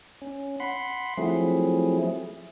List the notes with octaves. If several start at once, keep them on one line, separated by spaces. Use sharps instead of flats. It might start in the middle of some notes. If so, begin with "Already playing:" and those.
C#4
F#5 B5 C6
F3 F#3 A3 C4 E4 G#4